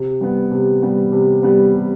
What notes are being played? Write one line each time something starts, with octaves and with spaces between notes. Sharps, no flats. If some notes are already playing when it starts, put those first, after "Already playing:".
Already playing: C3
G3 B3
C3
G3 B3
C3
G3 B3
C3